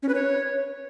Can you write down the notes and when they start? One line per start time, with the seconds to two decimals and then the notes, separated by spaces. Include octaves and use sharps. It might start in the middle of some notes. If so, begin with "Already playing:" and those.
0.03 C#4
0.09 B4
0.15 C#5